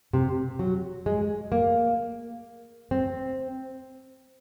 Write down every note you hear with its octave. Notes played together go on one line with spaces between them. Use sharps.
C3
F#3
G#3
A#3
C4